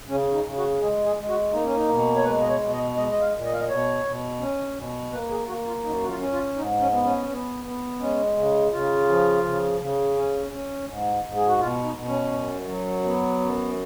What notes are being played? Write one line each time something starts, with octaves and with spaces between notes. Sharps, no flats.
C#3 C#4
D#4
C#3
F#4
G#3 G#4
G#4
G#3
F#4
A#3 D#4
C#4
D#4
B2
C#5
G#3 B4
D#5
C#5
B2
D#5
G#3 D#5
D#5
F5
A#2
D#5
F5
D#5
B2 C#5
B2
C#4
B2
A#3 B4
G#4
A#3 F#4
F4
F#2 D#4
F#4
F4
C#4
F4
G#2 D#4
C#4
B3
C#4
B3
B3
G#3 C#4
C#3
C#3 F4
F3
C#3
C#3
C#4
C#4
G#2
G#2
G#4
F#4
B2 F4
D#4
B2
C#4
F#2
F#3
B3
F#2